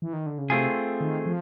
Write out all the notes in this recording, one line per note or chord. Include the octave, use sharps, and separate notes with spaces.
E3
D#3
D3
C#3
C3 A3 C4 F4 G#4
D#3
F3